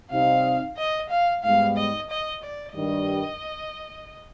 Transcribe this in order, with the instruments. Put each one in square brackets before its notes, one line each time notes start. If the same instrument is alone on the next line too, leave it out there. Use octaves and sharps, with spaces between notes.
[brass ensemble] C3 G3 C4 D#4 [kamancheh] F5
[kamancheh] D#5
F5
[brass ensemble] G#2 G3 B3 [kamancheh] F5
[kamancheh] D#5
D#5
D5
[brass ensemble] G2 D#3 G3 [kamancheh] D#5